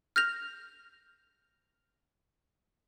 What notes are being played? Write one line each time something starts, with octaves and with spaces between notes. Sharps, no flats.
F6 G6 A#6 F7